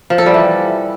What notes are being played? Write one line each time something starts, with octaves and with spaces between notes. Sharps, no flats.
F3
A4
G3
E3